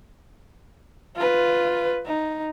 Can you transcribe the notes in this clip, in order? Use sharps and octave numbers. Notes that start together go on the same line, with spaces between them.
F4 B4
D#4